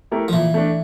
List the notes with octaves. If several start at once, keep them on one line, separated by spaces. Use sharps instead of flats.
A3 E4 G4 A#4
F3
A#2 E3
A3 D4